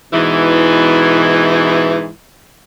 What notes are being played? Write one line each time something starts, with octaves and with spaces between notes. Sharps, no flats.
G#2 B2 E3